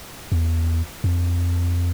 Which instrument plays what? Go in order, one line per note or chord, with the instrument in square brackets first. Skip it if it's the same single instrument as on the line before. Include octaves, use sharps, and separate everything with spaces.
[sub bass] E2
F2